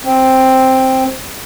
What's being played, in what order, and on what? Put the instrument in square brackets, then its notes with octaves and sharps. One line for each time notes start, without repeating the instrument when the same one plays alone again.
[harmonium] C4